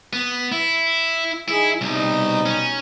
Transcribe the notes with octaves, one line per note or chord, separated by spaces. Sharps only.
B3
E4
F3 D#4 E4 G#4
C2 B2 G3 D#4
C#4